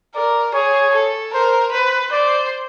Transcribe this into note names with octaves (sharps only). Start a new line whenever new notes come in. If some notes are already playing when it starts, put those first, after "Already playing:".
A#4 D5
G#4 C#5
A4
A#4 C5
B4 C5
C5 D5